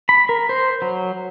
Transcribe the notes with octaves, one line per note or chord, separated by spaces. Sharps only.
B5
A#4
C5
F#3